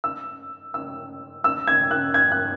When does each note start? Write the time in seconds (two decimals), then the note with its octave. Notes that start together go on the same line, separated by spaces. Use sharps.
0.04 E6
0.74 E6
1.44 E6
1.68 G#6
1.91 F#6
2.14 G#6
2.32 F#6